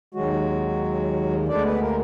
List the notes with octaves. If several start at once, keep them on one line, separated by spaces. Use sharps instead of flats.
D#2 D#3 F#3 G#3 F#4
D2 D3 G#3 D4 D5
B3 B4
A#3 A#4